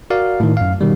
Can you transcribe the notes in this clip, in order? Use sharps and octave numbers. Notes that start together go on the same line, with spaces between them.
F#4 A#4 D5 F5
A2 D#3
F#2 F5
B2 D#3 G3